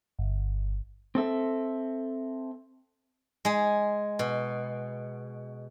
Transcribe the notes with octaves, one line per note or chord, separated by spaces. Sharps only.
G1
C4 A4 E5
G#3 G#4
B2